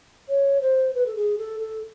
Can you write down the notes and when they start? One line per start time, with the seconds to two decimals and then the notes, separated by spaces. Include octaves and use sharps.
0.28 C#5
0.61 C5
0.95 B4
1.06 A4
1.15 G#4
1.38 A4
1.60 A4